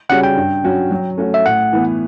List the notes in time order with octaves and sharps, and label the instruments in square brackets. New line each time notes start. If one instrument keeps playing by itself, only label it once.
[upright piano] C#3 G3 C#4 F#4 [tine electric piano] F#5
[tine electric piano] G5
[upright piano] G2
F#3 C#4 F#4
F#3
A3 C#4 F#4
[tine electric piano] E5
[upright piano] A2 [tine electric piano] F#5
[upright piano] E3 B3